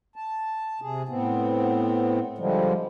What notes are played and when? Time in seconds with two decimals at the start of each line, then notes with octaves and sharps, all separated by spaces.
0.16 A5
0.81 C3 G#4
1.09 A2 B3 C4
2.38 D3 F3 G3 G#3